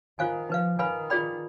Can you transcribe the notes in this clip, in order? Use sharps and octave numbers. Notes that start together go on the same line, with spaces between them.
D#3 F4 C5 F5 G#5
F3 D#4 B4 F5
D#3 B4 F5 G#5 B5
F4 G#4 D5 G5 B5